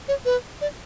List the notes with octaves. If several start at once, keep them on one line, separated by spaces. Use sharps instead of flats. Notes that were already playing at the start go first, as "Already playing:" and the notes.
C#5
B4
D5